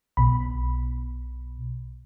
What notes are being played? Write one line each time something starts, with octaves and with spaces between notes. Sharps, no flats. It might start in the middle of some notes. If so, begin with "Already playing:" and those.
B1 B2 B5